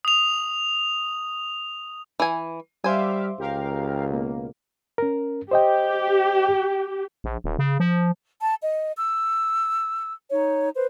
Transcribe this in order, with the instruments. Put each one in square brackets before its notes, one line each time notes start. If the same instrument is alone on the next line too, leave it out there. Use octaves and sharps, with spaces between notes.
[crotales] D#6 F7
[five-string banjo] E3 G#5
[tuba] G3 [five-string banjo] C5 G#5 [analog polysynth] E5 F5 D6
[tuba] C#2 [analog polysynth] G4 A#4 F5
[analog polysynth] B2 A#3
[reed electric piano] C#4 A#4
[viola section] G4 [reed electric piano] C5 D#5 G5
[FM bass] A#1
D#1
C#3
F3
[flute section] A5
D#5
E6
D#4 C#5
B4 C5